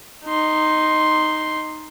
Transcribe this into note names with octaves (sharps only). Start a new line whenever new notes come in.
D#4 C6